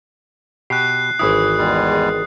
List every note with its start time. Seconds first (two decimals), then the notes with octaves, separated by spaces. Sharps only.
0.70 B2 G4 F#6 C7
1.19 G#1 E3 E4 D#6
1.58 E2 G3 G#3